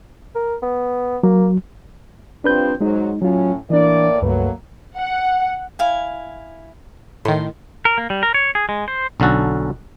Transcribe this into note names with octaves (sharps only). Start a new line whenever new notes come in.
A#4
B3
F#3 A#3
F3 G3 C4 D4 B4 G6
G#2 F#3 G#3 D#4
A2 F#3 C#4 F4
A2 E3 A#3 D4 D5
C#2 G2 F#3 A3 A#3 B4
F#5
E4 F5 G#5
A2 D#3 C6
A#4
A#3
G3
A#4
C#5
G#4
G#3
C5
B1 D3 C#4 F#4 A4